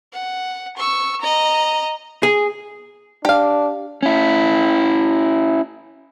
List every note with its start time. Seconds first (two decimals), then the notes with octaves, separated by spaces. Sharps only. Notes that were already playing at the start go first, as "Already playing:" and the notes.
0.13 F#5
0.77 C#6 E6
1.21 D#5 A#5
2.23 G#4
3.25 D4 G4 F5
4.03 C#4 E4